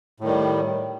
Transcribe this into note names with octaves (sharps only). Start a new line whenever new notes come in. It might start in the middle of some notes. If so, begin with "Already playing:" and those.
A2 D#3 G3